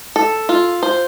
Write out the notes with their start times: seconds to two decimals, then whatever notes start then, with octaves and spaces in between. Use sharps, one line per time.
0.16 A4
0.49 F4
0.83 C5